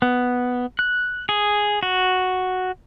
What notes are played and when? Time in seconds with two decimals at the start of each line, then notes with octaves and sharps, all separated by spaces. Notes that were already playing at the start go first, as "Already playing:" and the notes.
0.02 B3
0.79 F#6
1.29 G#4
1.83 F#4